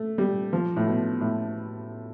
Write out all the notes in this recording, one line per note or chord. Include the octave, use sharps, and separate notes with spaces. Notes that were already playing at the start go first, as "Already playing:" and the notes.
Already playing: A3
G3
F3
A2
B2
A2